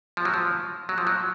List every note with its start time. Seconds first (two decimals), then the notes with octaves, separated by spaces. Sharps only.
0.17 F3
0.25 F#3
0.34 F3
0.89 F#3
0.98 F3
1.07 F#3